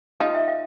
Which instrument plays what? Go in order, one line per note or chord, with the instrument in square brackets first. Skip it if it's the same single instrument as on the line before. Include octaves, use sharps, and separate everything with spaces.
[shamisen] D#4 F4 [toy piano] F5
[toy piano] E5
F5